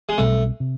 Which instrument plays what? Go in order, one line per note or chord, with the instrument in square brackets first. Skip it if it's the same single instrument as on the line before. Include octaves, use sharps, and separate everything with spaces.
[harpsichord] G#3
[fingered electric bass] B1 B2 G3 C4 [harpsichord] A3
[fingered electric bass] C3